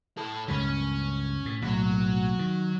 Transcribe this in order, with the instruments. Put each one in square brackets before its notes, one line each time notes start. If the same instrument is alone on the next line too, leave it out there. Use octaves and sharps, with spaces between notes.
[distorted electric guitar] A2 A4
[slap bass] C#2 G2 A#2 [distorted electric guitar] C#4
[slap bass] A2
[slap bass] B1 A2 A#3 [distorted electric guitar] F#3
[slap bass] D#3